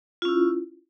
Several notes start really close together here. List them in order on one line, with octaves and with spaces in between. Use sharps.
F4 C#4 E4